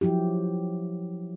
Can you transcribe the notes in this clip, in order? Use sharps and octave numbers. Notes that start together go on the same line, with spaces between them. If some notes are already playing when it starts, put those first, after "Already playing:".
F3 F#3 E4 G4